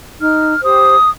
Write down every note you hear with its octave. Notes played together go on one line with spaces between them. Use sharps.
D#4 F6
G4 C5 D#6